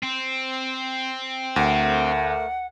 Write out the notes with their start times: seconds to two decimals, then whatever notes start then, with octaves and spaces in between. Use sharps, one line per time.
0.03 C4
1.56 D2 A3 A#4 F#5